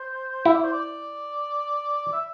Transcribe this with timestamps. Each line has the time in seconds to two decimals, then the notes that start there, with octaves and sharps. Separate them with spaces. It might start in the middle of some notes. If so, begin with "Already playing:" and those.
Already playing: C5
0.45 E4 E5
0.54 D5
0.64 C5
0.73 D5
2.12 E5